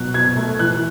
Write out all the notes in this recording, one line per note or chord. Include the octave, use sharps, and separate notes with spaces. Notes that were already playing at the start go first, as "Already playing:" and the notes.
Already playing: B2 F#3 F#6
B2 G#6
A3
E3 F#6